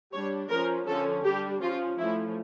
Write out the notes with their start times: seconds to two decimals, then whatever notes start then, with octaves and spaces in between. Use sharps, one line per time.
0.12 G3 D4 C#5
0.49 F3 C#4 A#4
0.86 D3 F3 C#4 A4
1.24 G3 D4 G4
1.60 F3 C#4 F4
1.98 F3 A3 C#4 E4